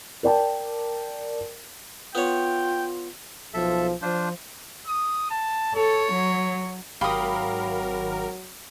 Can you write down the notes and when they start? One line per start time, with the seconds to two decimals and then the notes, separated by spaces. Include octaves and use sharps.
0.23 A#4 D5 G5 A5
2.15 B3 F4 C#5 G5
3.54 B1 F3 A4 E5
4.02 F3 D4 F4 C5
4.87 D#6
5.31 A5
5.75 A4 C#5
6.12 F#3
7.01 G#1 F#3 G4 A#4 F5 B5 D#6